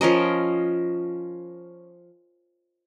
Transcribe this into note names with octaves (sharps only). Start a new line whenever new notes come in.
F3 C#4 A#4 D#5